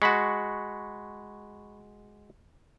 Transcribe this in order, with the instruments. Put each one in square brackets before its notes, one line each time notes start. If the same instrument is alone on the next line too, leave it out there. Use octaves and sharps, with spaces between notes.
[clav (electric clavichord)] G#3 F#4 [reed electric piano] B5 C#6